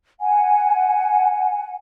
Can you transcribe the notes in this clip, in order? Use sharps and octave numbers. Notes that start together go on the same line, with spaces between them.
F#5 G#5